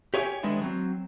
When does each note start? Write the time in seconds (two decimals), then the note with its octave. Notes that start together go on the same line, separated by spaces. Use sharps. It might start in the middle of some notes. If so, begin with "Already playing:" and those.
0.14 G4 C#5 D#5 E5 G5 G#5
0.43 D3 D#3 G#3 B3 D4 E4
0.62 F#3 C4